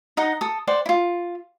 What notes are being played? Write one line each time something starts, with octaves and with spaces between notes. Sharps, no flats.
D#4 D#5 F#5
A4 D#6
C5 D5 F#5 G5
E4 F4